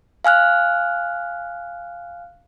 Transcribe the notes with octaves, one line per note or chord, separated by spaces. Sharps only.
F5 G#5 F6 F#6